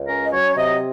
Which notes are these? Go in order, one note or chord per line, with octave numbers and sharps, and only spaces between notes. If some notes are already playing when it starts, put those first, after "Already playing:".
Already playing: C#2
C#4 A#4
D#5
F#3 C#5
C3 D#5